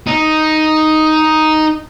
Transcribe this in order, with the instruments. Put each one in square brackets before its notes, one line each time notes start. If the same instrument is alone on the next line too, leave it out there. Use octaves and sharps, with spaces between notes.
[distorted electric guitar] D#4